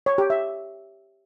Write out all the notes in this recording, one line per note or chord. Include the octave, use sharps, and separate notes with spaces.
C#5
G4
E5